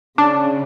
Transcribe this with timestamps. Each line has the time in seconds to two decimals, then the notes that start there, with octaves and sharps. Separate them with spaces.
0.18 C#3 D4